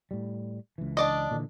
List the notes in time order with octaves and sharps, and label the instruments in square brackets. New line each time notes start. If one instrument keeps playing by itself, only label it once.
[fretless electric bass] A2 G3
C#2 E3
[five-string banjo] D4 D5 D#5
[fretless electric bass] A#2 D3 E3